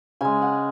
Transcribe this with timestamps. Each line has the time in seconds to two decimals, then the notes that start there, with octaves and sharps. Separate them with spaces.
0.21 C#3 G#3 G#5
0.42 F#5